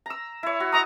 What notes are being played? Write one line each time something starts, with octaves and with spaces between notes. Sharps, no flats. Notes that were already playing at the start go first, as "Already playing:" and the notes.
A#5 E6
E4 C#5
F#4
D#5 A#5 C#6 D#6